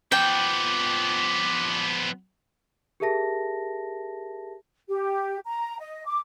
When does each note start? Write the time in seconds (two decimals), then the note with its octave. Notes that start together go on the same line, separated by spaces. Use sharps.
0.12 F3 B3 G5 D6
3.00 G4 G#4 A#4 E5 A5 A#6
4.89 G4
5.46 A#5
5.80 D#5
6.06 D6